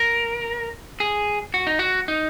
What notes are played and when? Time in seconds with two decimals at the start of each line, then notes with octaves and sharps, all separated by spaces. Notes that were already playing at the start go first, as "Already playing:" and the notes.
Already playing: A#4
1.00 G#4
1.54 F#4
1.67 D#4
1.79 F#4
2.08 D#4